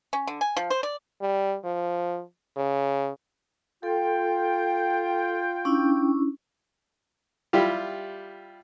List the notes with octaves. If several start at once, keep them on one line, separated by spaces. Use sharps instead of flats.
C#4
D3
G#5
F3
C5
D5
G3
F3
C#3
F4 A4 G5
C#4 D4 E4
G3 E4 F4 G4